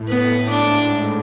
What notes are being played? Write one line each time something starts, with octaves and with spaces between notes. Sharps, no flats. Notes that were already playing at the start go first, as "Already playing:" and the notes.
Already playing: A2
B3
G#2 D4